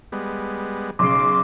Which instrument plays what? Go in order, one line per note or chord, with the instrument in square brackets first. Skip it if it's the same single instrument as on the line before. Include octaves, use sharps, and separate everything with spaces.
[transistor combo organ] G3 G#3 B3
[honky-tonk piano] B1 C#3 [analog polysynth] C6 D6